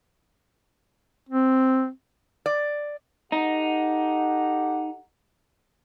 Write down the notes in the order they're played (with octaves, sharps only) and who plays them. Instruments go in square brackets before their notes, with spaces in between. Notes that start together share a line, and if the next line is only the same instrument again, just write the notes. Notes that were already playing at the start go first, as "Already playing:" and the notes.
[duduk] C4
[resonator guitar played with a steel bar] D5
[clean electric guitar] D#4 [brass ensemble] G4 A4 F#5